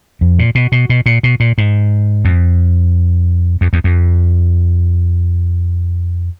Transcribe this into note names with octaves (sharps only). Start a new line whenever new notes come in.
F2
A#2
B2
B2
B2
A#2
B2
A#2
G#2
F2
F2
E2
F2